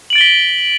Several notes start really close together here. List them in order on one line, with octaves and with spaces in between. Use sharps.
F#7 D7 A6 G7 B6